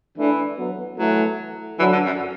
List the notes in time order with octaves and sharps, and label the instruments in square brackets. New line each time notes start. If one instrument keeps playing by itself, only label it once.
[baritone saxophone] E3 [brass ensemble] A3 D4
[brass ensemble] F#3 B3
[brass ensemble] E3 A3 [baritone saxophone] F#3
[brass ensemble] D3 F#3 [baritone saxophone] E3
[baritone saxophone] D3
F#2